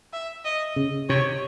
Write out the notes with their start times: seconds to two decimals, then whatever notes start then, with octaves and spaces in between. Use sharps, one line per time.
0.13 E5
0.45 D#5
0.76 C#3
1.09 C3 C#5